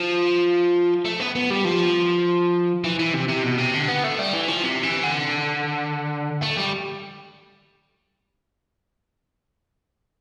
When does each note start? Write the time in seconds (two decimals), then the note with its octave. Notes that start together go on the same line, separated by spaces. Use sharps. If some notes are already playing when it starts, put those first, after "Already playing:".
Already playing: F3
1.05 A3
1.20 B3
1.35 B3
1.50 G3
1.65 F3
2.84 E3
2.99 E3
3.14 C3
3.29 C3
3.44 B2
3.58 C3
3.74 D3
3.88 B3
4.04 A3
4.18 G3
4.33 E3
4.48 F3
4.63 C3
4.83 E3
5.03 D3
6.42 A3
6.57 G3